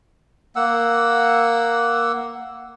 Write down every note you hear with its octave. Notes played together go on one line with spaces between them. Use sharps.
A#3 F#5 E6